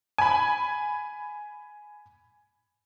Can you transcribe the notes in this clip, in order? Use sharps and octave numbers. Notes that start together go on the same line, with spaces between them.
G#5 B5